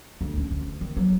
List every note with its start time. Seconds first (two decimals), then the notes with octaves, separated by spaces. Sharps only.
0.21 D2
0.37 C#4
0.51 D2
0.81 D#3
0.97 F#3